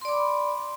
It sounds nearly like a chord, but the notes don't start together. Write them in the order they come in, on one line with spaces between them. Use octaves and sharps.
C6 D5 D6 B5